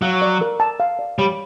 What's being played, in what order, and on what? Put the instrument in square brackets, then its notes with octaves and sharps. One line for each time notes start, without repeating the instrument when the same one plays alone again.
[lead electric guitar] F#3 [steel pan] F5
[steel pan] D5
A#4
A5
F5
D5
[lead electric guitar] G3 [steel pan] C#5